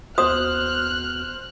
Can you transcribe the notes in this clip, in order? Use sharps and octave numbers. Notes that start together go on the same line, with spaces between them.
D#2 B3 F#4 C5 D#6 F6 F#6